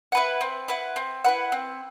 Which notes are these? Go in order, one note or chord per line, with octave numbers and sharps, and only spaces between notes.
E4 B4 F#5
C4
E4 B4 F#5
C4
E4 B4 F#5
C4